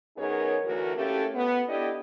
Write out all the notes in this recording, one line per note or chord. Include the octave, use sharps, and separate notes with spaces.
F#2 B3 D#4 G#4 A#4 C#5
D2 E3 A3 F#4 A#4
A3 A#3 C#4 E4 G4 A4
B3
D4 E4 G4 A4 D5 D#5